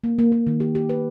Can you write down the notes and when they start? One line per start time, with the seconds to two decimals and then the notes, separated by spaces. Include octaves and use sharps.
0.04 A#3
0.19 A#3
0.32 A#3
0.47 D#3
0.60 G4
0.75 G4
0.89 B4